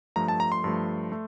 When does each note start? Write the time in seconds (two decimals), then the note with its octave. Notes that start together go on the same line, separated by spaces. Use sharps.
0.16 G2 F3 A3 A#5
0.28 A5
0.40 A#5
0.52 C6
0.64 G2 F3 A3
1.12 A3